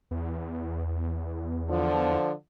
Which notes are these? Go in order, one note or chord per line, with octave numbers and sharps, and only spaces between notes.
E2
D3 F3